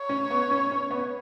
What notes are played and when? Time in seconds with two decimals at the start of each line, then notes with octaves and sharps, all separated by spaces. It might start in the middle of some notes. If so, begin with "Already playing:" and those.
Already playing: C#5
0.09 C#4
0.31 B3
0.51 C#4
0.71 C#4
0.91 B3